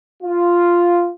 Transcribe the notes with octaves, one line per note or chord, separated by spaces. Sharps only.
F4